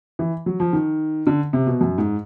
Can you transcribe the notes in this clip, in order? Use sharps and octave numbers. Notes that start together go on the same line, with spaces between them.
E3
F#3
F3
D#3
D3
C3
B2
F#2
G#2